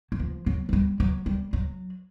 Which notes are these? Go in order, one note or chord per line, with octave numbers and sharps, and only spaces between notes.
F#3
F3
F#3
F#3
G3
F#3
G3
F#3